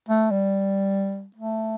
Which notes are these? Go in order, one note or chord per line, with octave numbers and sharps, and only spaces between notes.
A3
G3
A3